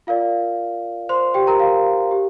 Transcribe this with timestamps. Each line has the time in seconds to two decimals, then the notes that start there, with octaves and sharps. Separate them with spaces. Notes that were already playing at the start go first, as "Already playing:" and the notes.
0.07 F4 A#4 D5 F5
1.09 C5 C6
1.34 G4 G5
1.47 A#4 A#5
1.60 F5
2.11 G4